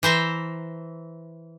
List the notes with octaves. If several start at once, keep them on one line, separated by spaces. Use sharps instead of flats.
E3 C5 E5 A#5